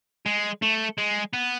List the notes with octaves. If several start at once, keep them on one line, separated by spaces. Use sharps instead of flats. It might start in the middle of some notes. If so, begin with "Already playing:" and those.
G#3
A3
G#3
B3